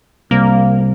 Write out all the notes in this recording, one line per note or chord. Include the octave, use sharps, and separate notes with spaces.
C2 A#3